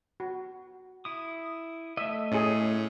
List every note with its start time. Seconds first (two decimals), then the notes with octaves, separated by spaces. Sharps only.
0.20 F#4
1.05 E4 D#6
1.97 A3 D#5 E5
2.32 A2 C#4 G#4